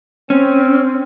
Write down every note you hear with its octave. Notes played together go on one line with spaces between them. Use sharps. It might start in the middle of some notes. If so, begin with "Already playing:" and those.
C4 C#4